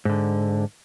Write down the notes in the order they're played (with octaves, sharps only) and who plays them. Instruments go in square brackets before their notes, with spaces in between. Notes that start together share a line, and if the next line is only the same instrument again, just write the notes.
[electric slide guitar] G#2 D3